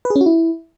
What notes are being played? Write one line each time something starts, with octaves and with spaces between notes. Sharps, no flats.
B4
G#4
C#4
F#4
E4